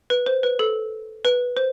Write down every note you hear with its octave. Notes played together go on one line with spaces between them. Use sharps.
B4
C5
B4
A4
B4
C5